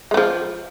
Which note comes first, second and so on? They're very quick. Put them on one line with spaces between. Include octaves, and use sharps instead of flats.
G#3 A3 F3